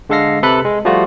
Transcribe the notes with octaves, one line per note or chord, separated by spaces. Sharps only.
D3 G#3 A4 F5 A#6 C7
C3 A4 B4 B5 F#6
G#3
F3 G3 A3 F4 F#4